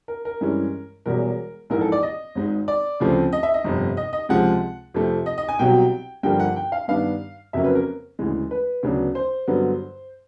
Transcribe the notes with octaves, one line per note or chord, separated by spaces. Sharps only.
A#4
A#4
G2 E3 G#3 C#4
E1 E2 B2 G3 A#4
A#1 G#2 E3 A#4
A4
D5
D#5
G#1 G#2 D#3
D5
D2 C#3 F3 A3 C4
D#5
E5
D#5
G1 F2 C3
D#5
D#5
C#2 C3 F3 G#3 F#5
F2 C3 F3 A3
D#5
D#5
G#5
C2 B2 F#3 G5
G2 D3 F3 A#3 G5
F#5
G5
F5
G2 D#3 G3 B3 D4 F5
F2 C#3 F#3 A#3 C#4 E5
B4
A#4
D2 C#3 E3 G#3
B4
D2 C#3 F#3 B3 D4
C5
G2 D3 F#3 B3